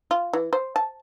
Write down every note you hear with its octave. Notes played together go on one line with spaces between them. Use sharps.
F4
E3
C5
A5